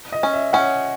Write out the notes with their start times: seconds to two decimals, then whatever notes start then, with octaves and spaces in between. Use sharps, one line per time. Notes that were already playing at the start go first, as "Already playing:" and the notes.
0.12 D#5
0.23 C#4
0.33 E5
0.53 C#4 F#5